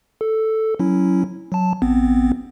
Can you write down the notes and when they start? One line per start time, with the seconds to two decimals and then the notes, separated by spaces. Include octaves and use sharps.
0.21 A4
0.79 F#3 C#4 E4
1.52 F#3 A5
1.82 A1 B3 C4